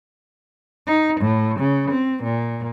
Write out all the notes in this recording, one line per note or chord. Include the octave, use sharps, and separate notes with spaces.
D#4
A2
C#3
C4
A#2